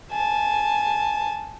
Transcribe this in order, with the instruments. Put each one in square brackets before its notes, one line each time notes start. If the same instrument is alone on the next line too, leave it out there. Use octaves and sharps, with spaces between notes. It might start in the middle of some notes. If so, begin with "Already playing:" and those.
[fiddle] G#5 A5